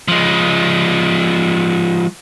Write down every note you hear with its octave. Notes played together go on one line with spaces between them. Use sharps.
F3 G#3